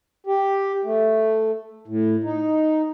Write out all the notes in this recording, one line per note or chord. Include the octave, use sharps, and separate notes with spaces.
G4
A3
A2
D#4